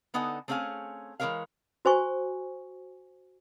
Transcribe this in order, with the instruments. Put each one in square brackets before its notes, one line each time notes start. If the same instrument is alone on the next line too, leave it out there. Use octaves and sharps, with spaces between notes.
[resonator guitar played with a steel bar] D3 B3 D#4 A4 F#5 G#5
A3 C4 C#4 G#4 F5 G#5
E3 G#3 G#4 A#4 C#5 F5
[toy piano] F#4 C5 G#5 C#6